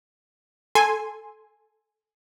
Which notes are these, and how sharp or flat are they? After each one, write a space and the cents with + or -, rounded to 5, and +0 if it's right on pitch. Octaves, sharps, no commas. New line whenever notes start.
A4 -5 G#5 +0 C6 +0